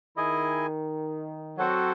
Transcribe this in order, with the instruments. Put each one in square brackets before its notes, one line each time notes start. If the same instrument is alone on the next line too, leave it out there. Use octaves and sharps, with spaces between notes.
[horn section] D#3 [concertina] E4 G#4 D#5 G#5
[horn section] F#3 [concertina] C4 F#4 A4 C5 F#5